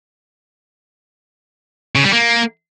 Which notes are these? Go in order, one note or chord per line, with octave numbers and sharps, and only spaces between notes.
C#3
G3
A#3